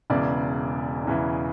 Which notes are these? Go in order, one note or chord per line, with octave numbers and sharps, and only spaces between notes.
E1 E2 C#3 E3 D5
E1 E2 C#3 E3